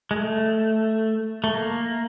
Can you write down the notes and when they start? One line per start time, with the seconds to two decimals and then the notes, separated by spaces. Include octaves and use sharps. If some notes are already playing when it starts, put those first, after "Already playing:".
0.11 G#3
0.16 A3
1.44 A3
1.54 A#3